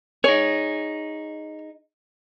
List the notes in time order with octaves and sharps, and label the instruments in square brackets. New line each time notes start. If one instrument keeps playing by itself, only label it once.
[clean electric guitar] D#4 G#4 [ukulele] C#5